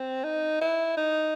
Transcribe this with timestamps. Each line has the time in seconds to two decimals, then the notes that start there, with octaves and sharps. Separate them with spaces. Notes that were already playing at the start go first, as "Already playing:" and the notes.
Already playing: C4
0.24 D#4
0.61 E4
0.97 D#4